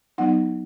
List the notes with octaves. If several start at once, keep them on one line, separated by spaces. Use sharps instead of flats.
F#3 B3 D#4 F#5